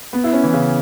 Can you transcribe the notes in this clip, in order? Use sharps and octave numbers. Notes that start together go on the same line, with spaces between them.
B3
E4
C#4
E3
C#3